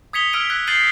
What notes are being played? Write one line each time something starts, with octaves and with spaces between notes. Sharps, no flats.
D#6 G#6 B6 C#7 F7 G7
E6 F6 G#6 D7 D#7
F#6 G#6 B6
G6 A6 C7 D#7 F#7 G7